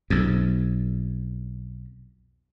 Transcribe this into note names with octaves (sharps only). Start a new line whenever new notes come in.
B1 F2